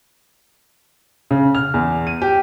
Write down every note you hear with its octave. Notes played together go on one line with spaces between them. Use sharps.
C#3
F6
E2
D#7
G4